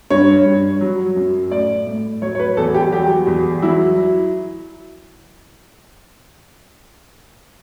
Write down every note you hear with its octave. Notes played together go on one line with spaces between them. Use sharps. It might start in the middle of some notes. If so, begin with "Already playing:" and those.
G2 C#5
G2
F#3
F#2
A2 D5
A2
F#3 C#5
C#5
B4
E2 A4
G4
F#3 G4
E2
F#3 E4